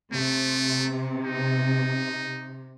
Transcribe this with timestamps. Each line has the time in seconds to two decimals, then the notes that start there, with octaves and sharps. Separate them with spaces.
0.13 C3 A3
1.25 D#4